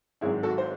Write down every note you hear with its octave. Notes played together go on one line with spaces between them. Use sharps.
G#1 G#2 F#3 C4 E4 G#4
F#4 A4
C5